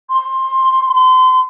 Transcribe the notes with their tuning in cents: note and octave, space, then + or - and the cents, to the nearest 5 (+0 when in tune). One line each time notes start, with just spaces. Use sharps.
C6 +15
C6 -30